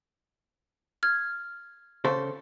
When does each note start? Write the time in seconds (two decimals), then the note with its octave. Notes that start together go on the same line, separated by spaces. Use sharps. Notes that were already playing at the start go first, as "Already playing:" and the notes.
1.03 F6 G#6
2.05 C#3 A4 C5